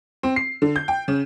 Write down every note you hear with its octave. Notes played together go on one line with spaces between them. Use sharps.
C4
C7
D3
G6
G5
C#3